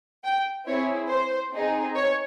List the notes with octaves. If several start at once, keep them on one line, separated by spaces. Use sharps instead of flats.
G5
C4 E4 G#4 C#5
C5
C4 D#4 G#4
C#5